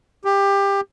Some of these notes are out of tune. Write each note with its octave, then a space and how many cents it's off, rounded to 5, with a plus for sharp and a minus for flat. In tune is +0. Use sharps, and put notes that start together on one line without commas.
G4 +20